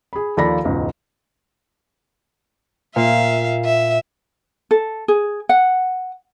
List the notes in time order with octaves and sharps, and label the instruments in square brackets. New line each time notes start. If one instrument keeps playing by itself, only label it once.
[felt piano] G#4 B5
D#2 F3 A4 D5 B5 A#6
E1 C#2 G#2
[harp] A#2 [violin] E5 F5
[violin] E5
[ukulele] A4
G#4
F#5